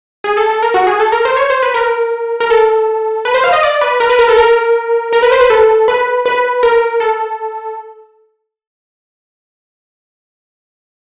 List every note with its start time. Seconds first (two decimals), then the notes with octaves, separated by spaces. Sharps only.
0.24 G#4
0.37 A4
0.50 A4
0.63 A#4
0.74 F#4
0.87 G#4
1.00 A4
1.12 A#4
1.25 C5
1.36 C#5
1.50 C5
1.63 B4
1.74 A#4
2.40 A#4
2.50 A4
3.25 B4
3.34 C5
3.44 F5
3.52 D#5
3.63 D5
3.81 B4
4.00 A#4
4.09 B4
4.19 A#4
4.29 A4
4.37 A#4
5.13 A#4
5.23 B4
5.31 C5
5.41 B4
5.50 A4
5.88 B4
6.26 B4
6.63 A#4
7.00 A4